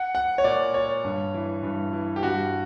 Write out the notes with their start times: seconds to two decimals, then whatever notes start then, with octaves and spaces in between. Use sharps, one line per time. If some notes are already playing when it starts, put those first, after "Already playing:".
Already playing: F#5
0.15 F#5
0.38 C#5
0.44 A#2 D5
0.74 C#5
1.05 G2
1.34 E3
1.63 G2
1.93 E3
2.16 G4
2.23 G2 F#4